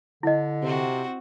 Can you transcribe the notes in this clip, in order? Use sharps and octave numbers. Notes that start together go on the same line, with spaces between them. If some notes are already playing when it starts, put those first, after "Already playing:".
D3 E4 D#5
C3 C4 F#4